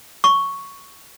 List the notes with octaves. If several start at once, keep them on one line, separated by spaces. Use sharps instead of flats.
C#6